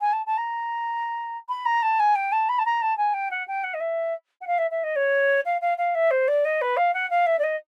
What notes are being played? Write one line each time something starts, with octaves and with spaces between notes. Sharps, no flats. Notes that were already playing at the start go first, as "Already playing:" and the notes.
G#5
A5
A5
A#5
B5
A#5
A5
G#5
G5
A5
B5
A5
A#5
A5
G#5
G5
F#5
G5
F#5
D#5
E5
F#5
F5
E5
E5
D#5
C#5
F5
F5
F5
E5
C5
D5
D#5
B4
F5
F#5
F5
E5
D5
D#5